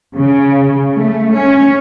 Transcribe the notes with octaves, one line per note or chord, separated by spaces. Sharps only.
C#3
A3
C#4